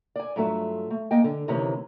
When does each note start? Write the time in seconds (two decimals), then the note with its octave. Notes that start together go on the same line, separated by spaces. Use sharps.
0.16 D5 G#5
0.36 G2 F#3 A3 F4 E5
0.90 A3
1.11 A#3 D#5 G5 G#5
1.24 D3
1.48 D2 C3 D#3 E3 C#4